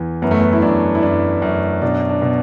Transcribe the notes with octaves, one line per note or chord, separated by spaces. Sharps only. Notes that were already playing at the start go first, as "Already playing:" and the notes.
Already playing: E2 E3
F#2 B3
A3
B3
E4
F#2 D4
E4
F#2 D4
F#2
B2 D4
D4
B2